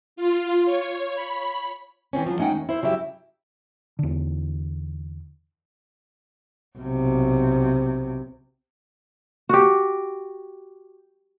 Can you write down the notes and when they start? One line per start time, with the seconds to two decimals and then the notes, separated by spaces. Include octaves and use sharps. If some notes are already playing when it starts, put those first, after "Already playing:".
0.16 F4
0.66 C#5
1.15 B5
2.13 E3 G3 C4 C#4
2.26 F3 F#3
2.39 A3 C#4 D#4 F#5 G5
2.52 D#2
2.69 E4 C5
2.82 G2 C#3 F#3 E4 G4 E5
3.99 E2 D3
6.78 B1 C3
9.49 F#4 G4